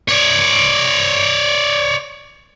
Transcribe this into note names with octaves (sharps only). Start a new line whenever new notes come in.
C#5 D5